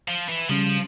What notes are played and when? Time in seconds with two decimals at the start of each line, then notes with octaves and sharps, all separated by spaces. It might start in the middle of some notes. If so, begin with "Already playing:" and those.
0.08 F3
0.29 E3
0.49 C#3 F3 G3 C#4